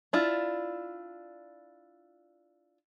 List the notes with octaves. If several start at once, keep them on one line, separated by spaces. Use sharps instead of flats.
D4 E4 F4